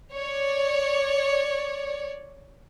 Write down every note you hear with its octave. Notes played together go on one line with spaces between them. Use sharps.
C#5 D5